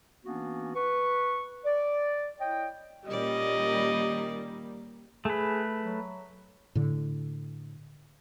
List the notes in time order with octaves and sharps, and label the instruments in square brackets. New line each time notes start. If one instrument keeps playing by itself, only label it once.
[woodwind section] E3 A#3 B3 C#4 D4 F#4
B4 C#6
D5
E4 C#5 D#5 G5
[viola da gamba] A#2 C#4 D5 [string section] D#3 G3 A#3 [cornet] D#5
[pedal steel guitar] A3 B4 [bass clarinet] G#4
[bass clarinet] F#3
[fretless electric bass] A2 D3